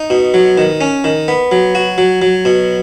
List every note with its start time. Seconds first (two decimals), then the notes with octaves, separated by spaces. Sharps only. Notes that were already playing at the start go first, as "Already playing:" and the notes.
Already playing: D#4
0.10 B2
0.34 F#3
0.58 D#3
0.81 C#4
1.04 D#3
1.28 B3
1.52 F#3
1.75 F#4
1.98 F#3
2.22 F#3
2.45 B2